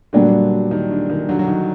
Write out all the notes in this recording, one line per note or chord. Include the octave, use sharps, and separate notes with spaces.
A#2 D3 F#3 G3 D4 G4
D#3
D3
D#3
D3 F#3
F#3
D#3